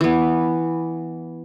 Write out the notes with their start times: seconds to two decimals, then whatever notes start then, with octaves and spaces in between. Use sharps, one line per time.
0.01 E3 B3